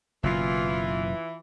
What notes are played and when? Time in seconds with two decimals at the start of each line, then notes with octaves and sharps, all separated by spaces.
0.23 F#1 F#2 B2 E3 F4